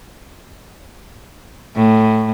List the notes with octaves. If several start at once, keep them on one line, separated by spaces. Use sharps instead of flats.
A2